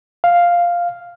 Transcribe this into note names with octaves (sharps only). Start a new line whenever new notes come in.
F5